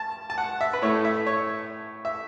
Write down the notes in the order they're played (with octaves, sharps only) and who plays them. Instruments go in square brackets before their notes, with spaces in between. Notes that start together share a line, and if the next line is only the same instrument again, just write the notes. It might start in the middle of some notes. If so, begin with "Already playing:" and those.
Already playing: [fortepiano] A5
A5
F#5
E5
B4
A2 A3 C#5
E5
C#5
E5